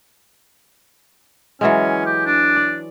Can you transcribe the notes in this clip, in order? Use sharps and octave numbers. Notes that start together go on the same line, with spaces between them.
E3 F#3 G#3 C#4
G4
D4
D5